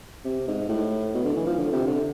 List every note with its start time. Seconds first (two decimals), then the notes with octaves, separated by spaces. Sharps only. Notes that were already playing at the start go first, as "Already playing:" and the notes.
0.25 C3
0.48 G#2
0.69 A2
1.14 B2
1.25 D3
1.36 E3
1.46 F3
1.58 D3
1.72 C3
1.87 D3